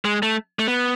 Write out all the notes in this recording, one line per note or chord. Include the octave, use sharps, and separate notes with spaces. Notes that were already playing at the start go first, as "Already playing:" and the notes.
G#3
A3
A3
B3